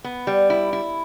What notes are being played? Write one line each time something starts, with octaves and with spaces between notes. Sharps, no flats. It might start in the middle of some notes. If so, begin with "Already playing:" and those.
B3
G3
E4
E4